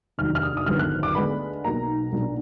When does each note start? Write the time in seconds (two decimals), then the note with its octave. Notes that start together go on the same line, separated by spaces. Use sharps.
0.18 F1 D#2 D#3 F#3 D4 F6
0.35 F6
0.43 D#6
0.57 D#6
0.66 G#1 F#2 D3 F3 B3 F6
0.79 F#6
1.03 D6
1.15 D2 D3 G#3 B3 D4 B5
1.64 B1 B2 A#3 D#4 A#5
2.12 B1 A#2 F#3 D4